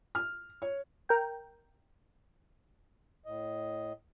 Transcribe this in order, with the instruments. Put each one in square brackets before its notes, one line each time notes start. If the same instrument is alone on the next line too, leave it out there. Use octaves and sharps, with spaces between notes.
[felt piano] F6
C#5
[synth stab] A#4 G5
[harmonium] A2 D#5